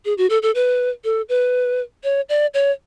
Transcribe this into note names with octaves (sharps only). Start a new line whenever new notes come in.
G#4
F#4
A4
A4
B4
A4
B4
C#5
D5
C#5